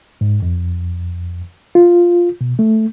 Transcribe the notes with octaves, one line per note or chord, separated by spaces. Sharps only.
G#2
F2
F4
B2
A3